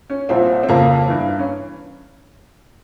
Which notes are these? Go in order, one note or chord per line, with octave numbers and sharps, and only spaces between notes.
C#4
C2 A#2 F3 C4
C4
F2 C#3 F3 A#3
G2 E3
C#4